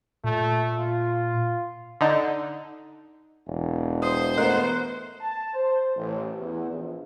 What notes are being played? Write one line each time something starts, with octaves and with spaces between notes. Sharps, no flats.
A#2 A3
F4
D3 D#4
E1
C5 D#6
A3 B3 A#4 D#5 F#5 F#6
A5
C5
A1
E2
A#1